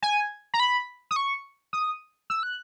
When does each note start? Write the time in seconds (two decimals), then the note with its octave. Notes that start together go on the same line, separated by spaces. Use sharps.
0.03 G#5
0.54 A#5
0.60 B5
1.11 D#6
1.16 C#6
1.73 D#6
2.30 E6
2.43 F#6